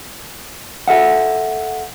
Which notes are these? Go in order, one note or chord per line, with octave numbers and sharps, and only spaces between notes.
A4 E5 F#5